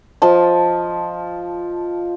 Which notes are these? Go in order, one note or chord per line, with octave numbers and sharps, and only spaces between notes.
F3 D#5 A5